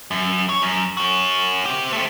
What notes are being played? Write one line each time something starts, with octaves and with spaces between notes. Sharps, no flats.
F#2
C#5
F#2
C#4 F#4
C4 G4
A3 C4